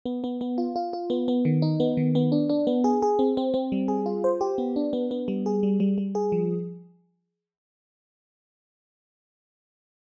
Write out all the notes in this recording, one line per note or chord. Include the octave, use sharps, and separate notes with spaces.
B3
B3
B3
F4
F4
F4
B3
B3
D#3
D#4
B3
D#3
B3
D4
D4
B3
G#4
G#4
C4
C4
C4
G3
G#4
F4
C5
G4
B3
D4
B3
B3
G3
G#4
G3
G3
G3
G#4
F3